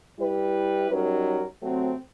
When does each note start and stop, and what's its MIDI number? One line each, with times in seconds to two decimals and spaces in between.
0.19 0.88 55
0.19 0.88 64
0.19 0.88 71
0.91 1.44 54
0.91 1.44 55
0.91 1.44 61
0.91 1.44 63
0.91 1.44 70
1.63 1.92 48
1.63 1.92 54
1.63 1.92 57
1.63 1.92 60